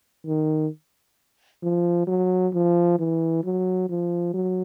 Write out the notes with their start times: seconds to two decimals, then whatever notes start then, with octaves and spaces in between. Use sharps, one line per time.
0.26 D#3
1.62 F3
2.07 F#3
2.53 F3
2.99 E3
3.44 F#3
3.89 F3
4.34 F#3